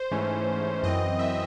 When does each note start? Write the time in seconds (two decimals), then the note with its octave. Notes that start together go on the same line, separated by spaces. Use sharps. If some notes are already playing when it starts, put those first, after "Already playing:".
Already playing: C5
0.11 G#2 E3 A3 C#4
0.83 F#2 E3 C4 D#5
1.19 E5